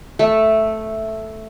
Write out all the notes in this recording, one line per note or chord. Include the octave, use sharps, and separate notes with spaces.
A3